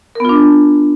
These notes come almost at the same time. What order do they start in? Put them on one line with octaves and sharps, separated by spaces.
A#4 B3 F4 D4